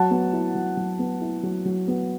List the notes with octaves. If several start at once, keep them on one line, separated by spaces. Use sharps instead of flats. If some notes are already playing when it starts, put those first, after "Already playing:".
Already playing: F#3 F#5 A5
B3
E4
F#3
F#3
B3
E4
F#3
F#3
B3